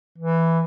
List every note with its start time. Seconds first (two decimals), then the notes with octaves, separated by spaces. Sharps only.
0.18 E3